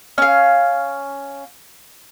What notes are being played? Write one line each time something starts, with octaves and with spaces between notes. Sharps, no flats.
C#4 F5